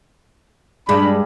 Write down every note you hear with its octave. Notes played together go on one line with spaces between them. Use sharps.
G2 G#3 D4 B5